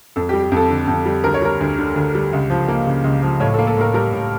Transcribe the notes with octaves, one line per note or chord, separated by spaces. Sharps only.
F2 A4
G4
G3
G4
F2 A4
D3
F2
G3
D2 A#4
C#5
G3 A#4
D2
D3
D2
G3
C#2
F3
A#3
C#3
C#2
F3
A2 C#5
A4
A#3
A4
A2 A#4
G3 A#4
A2